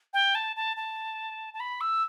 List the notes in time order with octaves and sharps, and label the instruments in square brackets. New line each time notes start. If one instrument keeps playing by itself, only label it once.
[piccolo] G5
A5
A5
A5
A5
B5
E6